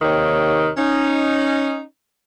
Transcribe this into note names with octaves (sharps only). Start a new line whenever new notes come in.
D#2 C3 D#3 G4 C#5
C#4 D#4